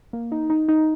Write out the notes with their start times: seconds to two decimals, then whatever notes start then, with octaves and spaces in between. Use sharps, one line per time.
0.13 A#3
0.32 D#4
0.50 D#4
0.68 D#4